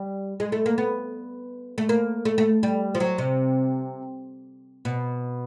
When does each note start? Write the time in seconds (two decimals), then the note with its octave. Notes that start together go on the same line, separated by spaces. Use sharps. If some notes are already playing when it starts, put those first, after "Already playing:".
Already playing: G3
0.40 G#3
0.52 A3
0.66 A#3
0.78 B3
1.78 A3
1.89 A#3
2.25 A3
2.38 A3
2.63 G3
2.95 F3
3.00 F#3
3.18 C3
4.85 B2